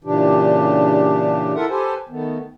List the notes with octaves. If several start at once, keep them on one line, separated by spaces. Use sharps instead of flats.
A#2 C#3 E3 D4 G4
E4 F4 A4 A#4 E5 F#5
G4 A4 B4 C5 G#5
D#3 A3 B3